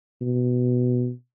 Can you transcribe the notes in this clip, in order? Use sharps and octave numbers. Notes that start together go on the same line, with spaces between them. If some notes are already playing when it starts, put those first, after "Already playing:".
B2